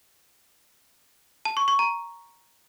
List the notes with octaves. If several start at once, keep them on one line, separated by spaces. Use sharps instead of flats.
A5
C#6
C#6
A#5